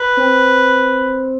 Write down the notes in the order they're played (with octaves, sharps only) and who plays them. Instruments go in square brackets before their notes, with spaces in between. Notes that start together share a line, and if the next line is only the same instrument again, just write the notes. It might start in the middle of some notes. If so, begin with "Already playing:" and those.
Already playing: [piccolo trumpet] B4
[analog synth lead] C4